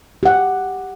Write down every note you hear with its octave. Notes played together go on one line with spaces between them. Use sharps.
G4 F#5